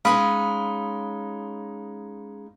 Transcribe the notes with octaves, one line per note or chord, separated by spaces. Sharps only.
G#3 C#4 D#4 F5 B5 D#6